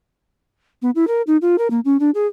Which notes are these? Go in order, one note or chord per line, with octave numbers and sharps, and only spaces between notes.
B3
E4
A#4
D#4
F4
A#4
A#3
C#4
D4
G#4